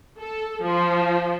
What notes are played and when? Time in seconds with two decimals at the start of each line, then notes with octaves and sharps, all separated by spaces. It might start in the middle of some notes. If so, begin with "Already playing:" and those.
0.19 A4
0.64 F3